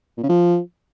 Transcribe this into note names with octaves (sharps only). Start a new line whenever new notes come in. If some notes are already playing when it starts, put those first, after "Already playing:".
A#2
C#3
F3